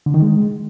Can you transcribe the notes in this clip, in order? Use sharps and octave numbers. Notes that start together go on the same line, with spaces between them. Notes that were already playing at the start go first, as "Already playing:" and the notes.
D3
D#3
G#3